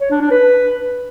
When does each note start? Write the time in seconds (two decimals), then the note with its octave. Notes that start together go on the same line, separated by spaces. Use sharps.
0.01 C#5
0.11 D4
0.21 D4
0.31 B4